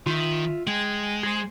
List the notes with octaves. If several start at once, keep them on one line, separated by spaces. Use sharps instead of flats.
D#3 F4 E5
G#3 G5 G#5
G#4 C5